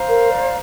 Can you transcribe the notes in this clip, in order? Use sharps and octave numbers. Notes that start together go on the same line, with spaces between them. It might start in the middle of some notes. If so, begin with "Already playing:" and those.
Already playing: C5 F5 A#5
A#4
D5